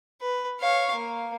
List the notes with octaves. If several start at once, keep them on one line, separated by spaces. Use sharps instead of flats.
B4
C#5 F5
A#3